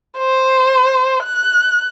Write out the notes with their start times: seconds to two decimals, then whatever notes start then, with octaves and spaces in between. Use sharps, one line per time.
0.19 C5
1.24 F#6